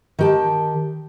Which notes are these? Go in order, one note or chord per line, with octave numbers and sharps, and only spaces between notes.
D#3 G4 A5